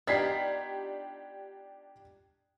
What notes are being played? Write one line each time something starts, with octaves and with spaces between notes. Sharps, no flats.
B3 D4 D#4 F4 G4 G#6 B6 C7